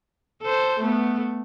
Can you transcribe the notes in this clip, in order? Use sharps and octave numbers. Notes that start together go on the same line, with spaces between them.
A4 C5
A3 B3